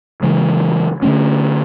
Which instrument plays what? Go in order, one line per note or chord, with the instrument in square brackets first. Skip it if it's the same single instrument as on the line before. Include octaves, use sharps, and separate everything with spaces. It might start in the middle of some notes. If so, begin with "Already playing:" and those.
[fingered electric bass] C#3 E3 G#3
D3 F3 A3 C#4